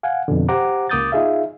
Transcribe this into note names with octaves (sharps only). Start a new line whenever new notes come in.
F5 F#5 G#5
F2 B2 D3
G4 C5 F#5 A#5 D6
C#2 A#3 D6 D#6 G6 A6
D#4 F4 G#4 E5 F5